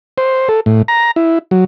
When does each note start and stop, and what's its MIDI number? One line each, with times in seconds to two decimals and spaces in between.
0.18 0.49 72
0.49 0.60 69
0.66 0.82 45
0.88 1.11 82
1.16 1.39 64
1.51 1.64 54